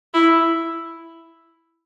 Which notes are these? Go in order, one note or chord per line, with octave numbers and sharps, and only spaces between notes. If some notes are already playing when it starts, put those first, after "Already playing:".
E4